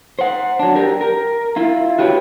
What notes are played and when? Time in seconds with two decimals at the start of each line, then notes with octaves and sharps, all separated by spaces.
0.19 C5 F#5
0.59 F#3 D4
0.76 G4 A#4
1.01 A#4
1.56 E4 F4
1.99 F#4 G4 B4 C#5 D#5 G5